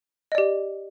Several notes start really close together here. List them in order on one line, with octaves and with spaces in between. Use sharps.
D#5 D5 G4